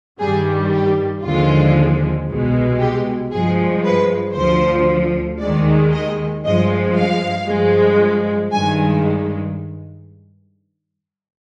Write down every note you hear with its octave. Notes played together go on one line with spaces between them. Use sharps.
G2 D#3 G3 G#4
G4
D#2 D3 F3 G#3 F4
C2 B2 G#3
G4
G2 F3 G#3 G#4
B4
D2 D3 F3 C5
D#2 D#3 G#3 D5
D#5
G2 F3 G#3 D#5
F5
G2 F3 G#3
G2 D#3 G#3 G#5